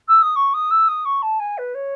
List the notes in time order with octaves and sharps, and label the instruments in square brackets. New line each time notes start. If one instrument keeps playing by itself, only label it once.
[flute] E6
D#6
C#6
D#6
E6
D#6
C#6
A5
G#5
B4
C#5